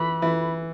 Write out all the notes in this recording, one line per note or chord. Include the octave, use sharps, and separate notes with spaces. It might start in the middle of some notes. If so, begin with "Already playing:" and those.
Already playing: E3 B5
E3